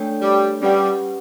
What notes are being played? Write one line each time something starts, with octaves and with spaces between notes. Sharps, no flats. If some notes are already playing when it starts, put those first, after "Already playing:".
Already playing: A3 D4 A4 C#5 G5
G3
G3 C#4 G4 B4 F#5